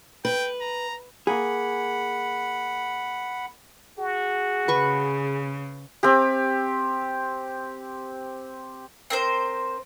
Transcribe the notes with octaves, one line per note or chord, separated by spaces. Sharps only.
B4 G5
A#5
A#3 G#4 F#5 B5
F#4 G#4
C#3 B4 C#6
C4 G4
C4 A#4 C5